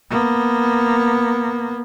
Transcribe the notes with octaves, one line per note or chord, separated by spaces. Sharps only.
A#3 B3